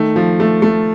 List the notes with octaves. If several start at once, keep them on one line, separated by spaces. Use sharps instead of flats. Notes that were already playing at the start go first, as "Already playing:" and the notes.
Already playing: D#3 A3
F3
A3
A3